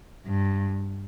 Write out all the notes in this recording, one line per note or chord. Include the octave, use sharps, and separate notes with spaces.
G2